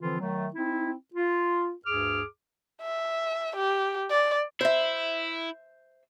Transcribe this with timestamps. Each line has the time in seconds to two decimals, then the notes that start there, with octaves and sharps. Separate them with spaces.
0.01 D3 E3 F3 C4 F4
0.20 D#3 F#3 A3
0.55 C4 D#4 E4
1.14 F4
1.86 D2 G2 G#4 D6 F6
2.81 E5
3.56 G4
4.10 D5
4.61 E4 C5 E5